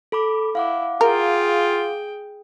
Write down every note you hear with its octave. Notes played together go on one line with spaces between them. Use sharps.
A4 B5 D6
E4 F5 F#5 D6
F4 G#4 A#4 G5